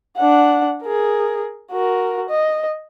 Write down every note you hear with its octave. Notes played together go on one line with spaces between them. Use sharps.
D4 F#5
G#4 A#4
F#4 A#4
D#5